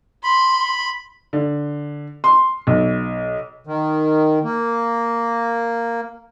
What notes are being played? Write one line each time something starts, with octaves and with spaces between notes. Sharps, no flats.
B5 C6
D3
C6
B1
D#3
A#3